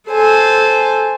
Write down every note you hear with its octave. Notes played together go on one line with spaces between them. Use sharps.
A4 C5 G#5